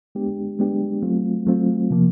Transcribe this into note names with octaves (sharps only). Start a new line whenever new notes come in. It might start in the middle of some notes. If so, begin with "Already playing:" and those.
G#3 B3 D4 G4
G#3 B3 D4 G4
F#3 A3 C4 F4
F#3 A3 C4 F4
C3 F3 A#3